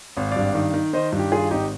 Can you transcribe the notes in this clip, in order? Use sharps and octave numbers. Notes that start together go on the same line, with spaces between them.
G#1 F5
G2 D5 F5
D#3
D#3
D#3 C5 D#5
G2
G4
D#3 F4 G#4
G#1 D#4 G4